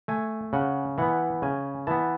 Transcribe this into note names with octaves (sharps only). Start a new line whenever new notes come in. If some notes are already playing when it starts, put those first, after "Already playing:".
A3 G#5
C#3 F#5
E3 B3 F#5
C#3 G#5
E3 B3 A5